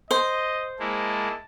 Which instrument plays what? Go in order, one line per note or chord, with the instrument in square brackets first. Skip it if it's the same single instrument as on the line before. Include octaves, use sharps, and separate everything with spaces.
[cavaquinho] C5 [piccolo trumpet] D#5
[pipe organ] G#3 A#3 E4 [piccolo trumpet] A5